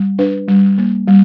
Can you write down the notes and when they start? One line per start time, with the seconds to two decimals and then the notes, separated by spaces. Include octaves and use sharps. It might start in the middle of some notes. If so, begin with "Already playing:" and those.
Already playing: G3
0.19 D4 B4
0.48 G3
0.78 A#3
1.07 G3